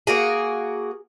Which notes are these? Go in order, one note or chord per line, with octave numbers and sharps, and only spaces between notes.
A#3 F#4 G#4